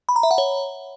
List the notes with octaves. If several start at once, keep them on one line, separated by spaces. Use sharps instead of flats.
B5
A#5
E5
F#5
C#5